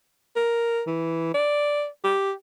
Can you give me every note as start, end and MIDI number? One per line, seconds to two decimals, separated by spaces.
0.36 0.82 70
0.87 1.31 52
1.34 1.87 74
2.04 2.32 67